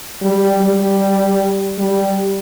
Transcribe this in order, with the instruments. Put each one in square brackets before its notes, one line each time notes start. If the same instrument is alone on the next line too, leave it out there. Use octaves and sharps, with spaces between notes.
[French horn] G3
G3
G3